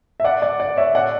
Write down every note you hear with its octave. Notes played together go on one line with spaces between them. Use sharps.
E5
D5 F#5
D5
D5
C#5 E5
D5 F#5